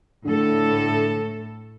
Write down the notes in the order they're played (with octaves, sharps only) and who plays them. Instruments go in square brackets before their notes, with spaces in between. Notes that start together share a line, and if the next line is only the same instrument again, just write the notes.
[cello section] A2 A4 [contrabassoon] D3